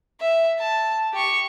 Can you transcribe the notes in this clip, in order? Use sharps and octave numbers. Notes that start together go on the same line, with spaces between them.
E5
A5
G4 C#6